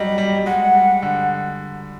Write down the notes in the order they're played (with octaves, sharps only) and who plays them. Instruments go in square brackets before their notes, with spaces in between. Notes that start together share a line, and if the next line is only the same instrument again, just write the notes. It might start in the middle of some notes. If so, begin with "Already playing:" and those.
Already playing: [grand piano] F#3 G3 [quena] D#5
[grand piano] G3
G3
[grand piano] G#3 [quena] F#5
[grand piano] G3
D3